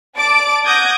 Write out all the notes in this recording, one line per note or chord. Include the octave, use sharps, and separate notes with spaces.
D5 A5 D6 D7
F#5 D6 D#6 G6 G#6 A#6